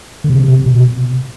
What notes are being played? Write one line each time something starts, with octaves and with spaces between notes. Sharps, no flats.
D3
C3
C3
B2